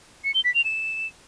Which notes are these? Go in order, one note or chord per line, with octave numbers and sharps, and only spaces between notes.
C#7
G7
B6
F7
E7